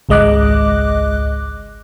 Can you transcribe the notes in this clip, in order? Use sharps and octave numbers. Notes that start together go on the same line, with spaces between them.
G#1 C#2 G#3 D#5 D6 F#6